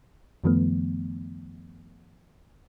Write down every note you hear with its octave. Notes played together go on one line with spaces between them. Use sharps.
F#2 D#3 F3 A3 B3